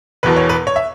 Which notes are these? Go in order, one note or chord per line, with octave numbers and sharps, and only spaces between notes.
E1 E2 B2 B4
C#5
B4
C#5
E5